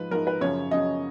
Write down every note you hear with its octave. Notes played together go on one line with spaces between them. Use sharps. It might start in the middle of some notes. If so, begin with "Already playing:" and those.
Already playing: G#2 F3 B4
G#2 F3 A#4
B4
F#2 C#3 F3 C#5
F#2 C#3 F3 D#5